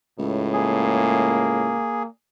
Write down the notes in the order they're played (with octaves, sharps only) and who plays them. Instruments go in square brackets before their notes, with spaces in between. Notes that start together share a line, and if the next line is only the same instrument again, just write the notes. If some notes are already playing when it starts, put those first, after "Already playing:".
[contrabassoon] C#2 [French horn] A2
[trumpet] A#3 [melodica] G#4